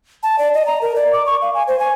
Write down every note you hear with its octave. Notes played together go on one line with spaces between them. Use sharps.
A5
D5
D#5
A#5
A#4
D5
D6
C#6
F5
G#5
C5
G#5